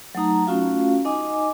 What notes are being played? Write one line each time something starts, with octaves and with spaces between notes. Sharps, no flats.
F#3 A3 D#4 A#5
A3 C#4 F4 F#4 F5
D#4 D#5 G#5 D6